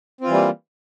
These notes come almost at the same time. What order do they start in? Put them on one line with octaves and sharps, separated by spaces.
C4 F4 E3 G3 A#3